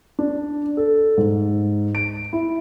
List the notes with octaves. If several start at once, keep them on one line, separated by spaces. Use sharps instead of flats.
D4
A4
G#2
D7
E4